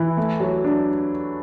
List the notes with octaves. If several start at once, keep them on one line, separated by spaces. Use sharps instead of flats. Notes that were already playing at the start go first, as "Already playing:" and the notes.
Already playing: E3
A3
F#3
D4